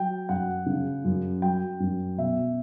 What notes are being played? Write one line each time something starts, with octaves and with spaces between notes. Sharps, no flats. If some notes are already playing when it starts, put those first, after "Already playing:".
Already playing: F#3 G5
F#2 F#5
C#3
F#2
F#3 G5
F#2
B2 E5